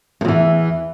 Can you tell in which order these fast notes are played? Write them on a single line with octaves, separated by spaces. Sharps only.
G2 E2 E3